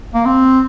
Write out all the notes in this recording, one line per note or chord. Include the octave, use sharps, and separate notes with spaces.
A#3
C4